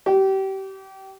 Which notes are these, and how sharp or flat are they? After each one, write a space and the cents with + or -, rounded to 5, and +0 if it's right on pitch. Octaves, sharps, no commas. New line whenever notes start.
G4 -30